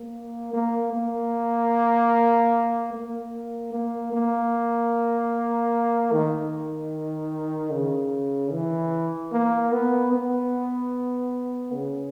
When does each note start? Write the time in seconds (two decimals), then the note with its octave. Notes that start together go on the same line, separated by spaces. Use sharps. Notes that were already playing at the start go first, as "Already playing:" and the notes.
Already playing: A#3
0.53 A#3
0.93 A#3
2.93 A#3
3.73 A#3
4.13 A#3
6.13 D#3
7.72 C#3
8.52 E3
9.32 A#3
9.72 B3
10.12 B3
11.72 C#3